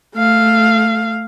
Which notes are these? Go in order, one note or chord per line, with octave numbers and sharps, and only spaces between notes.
A3 F5